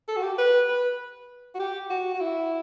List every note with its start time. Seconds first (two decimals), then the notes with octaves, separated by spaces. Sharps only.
0.08 A4
0.16 F#4
0.22 G4
0.38 B4
0.69 B4
1.55 F#4
1.60 G4
1.90 F#4
2.14 F#4
2.21 E4